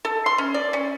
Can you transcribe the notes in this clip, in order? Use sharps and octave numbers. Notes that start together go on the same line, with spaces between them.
A4
C6
C#4
D5
C#4